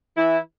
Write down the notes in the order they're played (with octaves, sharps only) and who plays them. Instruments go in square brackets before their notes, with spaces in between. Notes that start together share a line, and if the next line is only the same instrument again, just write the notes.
[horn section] E3 E4